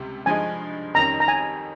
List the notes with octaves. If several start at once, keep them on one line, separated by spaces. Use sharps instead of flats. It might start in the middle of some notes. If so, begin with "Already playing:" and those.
Already playing: C#2 C3 G3
G2 F3 G#3 D#4 G#5
F2 D#3 G3 C#4 G4 A#5
A#5
G#5